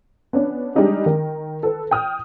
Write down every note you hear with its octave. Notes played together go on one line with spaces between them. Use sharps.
B3 C#4 D4
G3 G#3 D4 D#4 G4
D#3 A#4
A4 B4
G5 D#6 F6